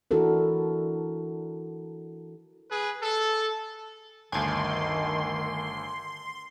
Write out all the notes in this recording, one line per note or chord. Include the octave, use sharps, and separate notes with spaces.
E3 D4 E4 F#4 A4 A#4
G#4 B4
A4
G1 D2 D#3 G#5 A5 C6